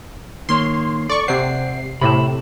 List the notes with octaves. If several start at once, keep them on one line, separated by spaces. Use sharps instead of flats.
D#3 A#3 C#5 C6
A4 D5 C#6
C3 C5 D5 F#5 C7
A2 C3 E5 B5